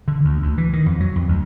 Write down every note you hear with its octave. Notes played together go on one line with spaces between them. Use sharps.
D3
D2
D2
E3
D#3
F2
F#3
F2
D2